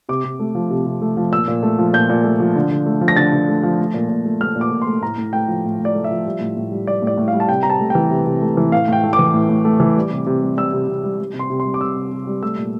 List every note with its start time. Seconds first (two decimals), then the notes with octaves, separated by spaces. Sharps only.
0.09 C3 D6
0.24 C3
0.40 A3
0.55 F3
0.70 C3
0.86 C3
1.02 A3
1.17 F3
1.32 A#2 E6
1.48 A#2
1.63 A3
1.79 F3
1.93 A#2 G6
2.09 A#2
2.24 A3
2.40 F3
2.56 D3
2.71 D3
2.86 A3
3.01 F3
3.08 A#6
3.16 D3 A6
3.33 D3
3.49 A3
3.63 F3
3.79 A3
3.94 A#2
4.09 A#2
4.26 A3
4.41 A3 F6
4.56 A#2
4.61 D6
4.71 A#2
4.82 C6
4.87 A3
5.02 A2 A#5
5.18 A2
5.33 A3 G5
5.48 F3
5.64 A2
5.80 A2
5.85 D5
5.95 A3
6.04 E5
6.10 F3
6.26 G3
6.40 A2
6.57 A2
6.72 G3
6.87 G3 D5
7.02 A2 D5
7.17 A2
7.28 F5
7.33 G3
7.40 A5
7.48 C3 G5
7.63 C3 A#5
7.70 A5
7.80 A3
7.90 E3 G5
8.11 C3
8.26 C3
8.42 A3
8.57 E3
8.72 A2 F5
8.88 A2 G5
9.04 A3
9.13 D6
9.19 E3
9.34 A2
9.49 A2
9.65 A3
9.80 E3
9.96 G3
10.11 C3
10.26 C3
10.42 G3
10.57 G3 E6
10.73 C3
10.88 C3
11.03 G3
11.18 G3
11.34 C3
11.39 C6
11.50 C3
11.60 C6
11.66 G3
11.74 D6
11.81 G3 E6
11.96 C3
12.11 C3
12.27 G3
12.43 A3 E6
12.58 A#2